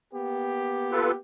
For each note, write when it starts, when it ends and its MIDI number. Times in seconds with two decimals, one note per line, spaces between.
0.13 1.17 58
0.13 1.17 59
0.13 1.17 67
0.92 1.11 65
0.92 1.11 69
0.92 1.11 71